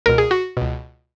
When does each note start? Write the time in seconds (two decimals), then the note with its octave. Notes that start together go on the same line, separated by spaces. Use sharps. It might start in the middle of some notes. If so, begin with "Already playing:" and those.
0.06 C#2 B2 A#4
0.18 G#4
0.31 F#4
0.57 C#2 B2